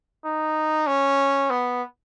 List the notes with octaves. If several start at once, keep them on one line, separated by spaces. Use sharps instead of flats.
D#4
C#4
B3